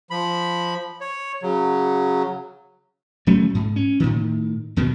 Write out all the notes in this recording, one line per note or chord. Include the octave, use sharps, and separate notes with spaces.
F3 B5
C#5
C#3 F#3
D1 F#3 A3 C#4
G#2
C#4
A2 D#3
D#2 B2 D#3